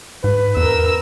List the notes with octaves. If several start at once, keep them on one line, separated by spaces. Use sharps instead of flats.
G#2 B4
E2 A#4 E6